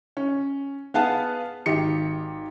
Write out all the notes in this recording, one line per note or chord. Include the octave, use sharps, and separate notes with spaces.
C#4
B3 G#4 B4 F5 F#5 A5
G#1 D#3 G4 C#7